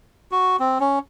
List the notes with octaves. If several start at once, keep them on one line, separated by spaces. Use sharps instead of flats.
F#4
C4
C#4